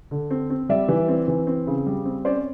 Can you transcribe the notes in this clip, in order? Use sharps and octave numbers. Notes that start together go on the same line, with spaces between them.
D3
C4
C4
G3 D5 E5
E3
C4
E3
C4
C#3
G3
C4
C#4 C5 D5